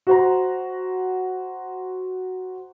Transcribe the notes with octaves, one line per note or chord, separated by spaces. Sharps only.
F#4 C5 A#5